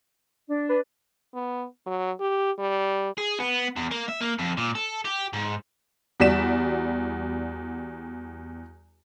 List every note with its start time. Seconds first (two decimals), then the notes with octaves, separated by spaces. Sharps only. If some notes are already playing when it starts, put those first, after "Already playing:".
0.48 D4
0.69 B4
1.34 B3
1.86 F#3
2.20 G4
2.59 G3
3.18 G#4
3.40 B3
3.77 E2
3.91 A#3
4.08 E5
4.21 A#3
4.39 F2
4.57 A#2
4.75 A4
5.05 G4
5.33 G#2
6.20 E2 G3 F#4 D5 B6 E7